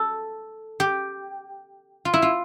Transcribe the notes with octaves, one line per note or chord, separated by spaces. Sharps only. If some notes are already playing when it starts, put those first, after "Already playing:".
Already playing: A4
G4
F4
E4
F4